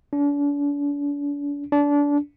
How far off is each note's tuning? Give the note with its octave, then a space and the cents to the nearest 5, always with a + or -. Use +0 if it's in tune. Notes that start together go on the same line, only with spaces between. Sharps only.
D4 -40
D4 -25